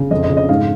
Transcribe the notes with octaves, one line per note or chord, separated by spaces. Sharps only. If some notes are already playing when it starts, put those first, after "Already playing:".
Already playing: C#3
F2 D#5
D#5
C#3
D#5
G#2 F5